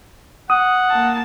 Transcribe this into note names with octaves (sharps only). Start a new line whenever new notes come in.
F#5 D#6
A#3 A5